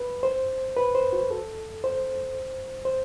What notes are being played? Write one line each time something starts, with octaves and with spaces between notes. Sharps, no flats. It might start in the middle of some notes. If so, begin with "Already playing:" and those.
Already playing: B4
C5
B4
C5
F#4
A4
C5
C5